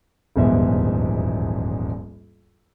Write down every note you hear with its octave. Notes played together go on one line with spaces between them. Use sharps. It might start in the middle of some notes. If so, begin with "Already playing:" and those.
D#1 A#1 E2 G#2 B2 E5